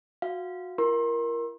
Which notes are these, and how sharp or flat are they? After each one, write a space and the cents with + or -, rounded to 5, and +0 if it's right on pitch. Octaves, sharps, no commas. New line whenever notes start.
F#4 -25 F5 -20
E4 +45 A#4 +10 C6 +35